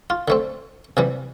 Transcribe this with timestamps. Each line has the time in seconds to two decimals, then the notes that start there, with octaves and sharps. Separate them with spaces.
0.10 F4
0.28 D3 A3 C4
0.97 C3 E3 G3